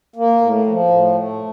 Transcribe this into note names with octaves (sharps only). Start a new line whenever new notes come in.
A#3
A2
F3
A2
A3